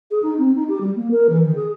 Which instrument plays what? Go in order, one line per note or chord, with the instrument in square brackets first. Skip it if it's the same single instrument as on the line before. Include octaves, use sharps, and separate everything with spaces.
[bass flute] G#4
D#4
C4
D#4
G4
G3
A#3
A#4
E3
D#3
G#4